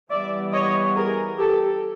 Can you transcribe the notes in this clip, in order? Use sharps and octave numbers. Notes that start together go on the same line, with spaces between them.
E3 G3 B3 D5 E5
C#5 D#5
G#4 A#4
G4 A4